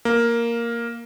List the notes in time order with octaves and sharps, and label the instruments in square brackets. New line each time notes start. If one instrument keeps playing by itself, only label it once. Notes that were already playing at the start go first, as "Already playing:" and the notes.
[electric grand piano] A#3